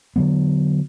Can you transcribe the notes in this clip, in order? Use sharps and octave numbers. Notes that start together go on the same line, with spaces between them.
D3 F#3 B3